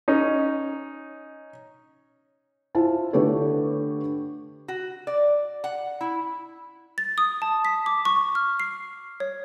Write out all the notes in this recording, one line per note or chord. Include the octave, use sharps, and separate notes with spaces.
C#4 D#4
E4 F4 C5 A5
D3 A3 G4 A4 B4 C#5
F#4
D5
F#5
E4
A6
D#6
A5
B6
D6
C#6
F6
C7
C#5